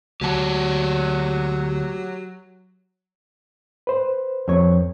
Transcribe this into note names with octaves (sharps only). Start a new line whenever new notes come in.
D2 F#3 G4 C#5 F#5 A5
B4 C5
F2 C#5